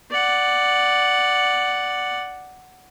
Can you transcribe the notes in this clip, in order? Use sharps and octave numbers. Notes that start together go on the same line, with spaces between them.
D5 F#5